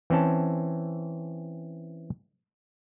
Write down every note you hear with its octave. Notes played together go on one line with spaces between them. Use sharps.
E3 C4 C#4 A5